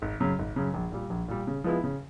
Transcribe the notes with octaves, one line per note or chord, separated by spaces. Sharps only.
G#1
F#2 C#3
G#1
F#2 C#3
A#1
A#2 G3
A#1
A#2 G3
C#3
F3 G#3 B3 E4
C#3